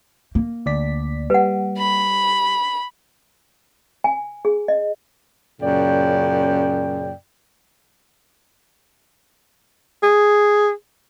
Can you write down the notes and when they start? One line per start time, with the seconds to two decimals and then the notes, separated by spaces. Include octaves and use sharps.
0.35 A#3
0.66 D2 D5 B6
1.30 G3 B4 F#5
1.78 B5
4.04 G#5
4.45 G#4
4.68 D#5
5.61 F#2 A#2 C#3 D5 G5
10.03 G#4